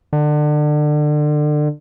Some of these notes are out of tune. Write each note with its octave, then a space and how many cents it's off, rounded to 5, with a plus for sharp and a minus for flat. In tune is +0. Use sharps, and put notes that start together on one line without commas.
D3 +30